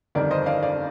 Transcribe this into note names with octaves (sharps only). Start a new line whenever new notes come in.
G1 F2 D#3 G3 A#4 D5
C5 D#5
D5 F5
D5 F5